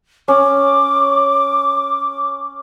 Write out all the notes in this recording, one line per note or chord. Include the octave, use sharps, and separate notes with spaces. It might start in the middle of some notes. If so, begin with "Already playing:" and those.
C#4 D6